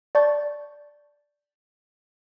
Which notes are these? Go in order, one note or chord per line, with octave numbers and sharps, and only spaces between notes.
D5 A5 C#6 G6 A6